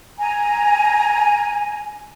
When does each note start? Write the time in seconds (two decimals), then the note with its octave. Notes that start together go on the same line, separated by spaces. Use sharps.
0.19 G#5 A#5